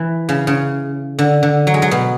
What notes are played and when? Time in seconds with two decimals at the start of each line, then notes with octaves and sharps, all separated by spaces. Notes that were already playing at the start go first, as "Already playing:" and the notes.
Already playing: E3
0.29 C#3
0.47 C#3
1.19 D3
1.43 D3
1.67 F#3
1.74 G#3
1.82 F#3
1.91 B2